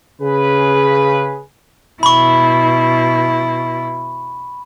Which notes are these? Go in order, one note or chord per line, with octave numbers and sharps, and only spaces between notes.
C#3 G#4 B4
B2 E4 B5 C#6